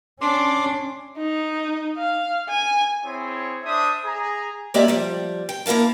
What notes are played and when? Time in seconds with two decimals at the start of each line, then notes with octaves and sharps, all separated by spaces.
0.21 C#4 D4 C6 D6
1.17 D#4
1.97 F5
2.49 G#5
3.05 C4 E4 G#4 C5 C#5
3.64 D4 C5 E5 D#6
4.04 G#4 A#5
4.74 G#3 A#3 C#4 G4 D5 E5
4.88 F3 G3
5.49 G5
5.66 A#3 E4 A#4 F5 A5